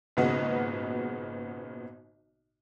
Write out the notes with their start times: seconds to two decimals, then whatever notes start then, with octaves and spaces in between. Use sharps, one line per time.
0.17 G#1 A#2 C#3 B3 F#4 D#5